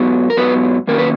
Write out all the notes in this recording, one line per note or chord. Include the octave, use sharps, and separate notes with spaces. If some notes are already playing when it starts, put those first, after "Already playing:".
Already playing: G#2 F#3 B3
A#4
G#2 F#3 B3 B4
F#2 D#3 A#3 C#4 A#4
B4